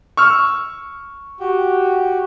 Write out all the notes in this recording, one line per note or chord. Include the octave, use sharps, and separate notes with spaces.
C#6 E6 F6
F#4 G4